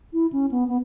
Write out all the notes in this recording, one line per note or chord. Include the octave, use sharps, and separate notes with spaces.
E4
C#4
B3
B3